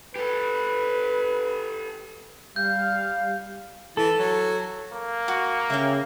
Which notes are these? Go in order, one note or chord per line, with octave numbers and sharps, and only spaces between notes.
G4 A4 B4
G3 F5 G6
E3 A4
F#3
A#3
F#4
C#3 E5 G5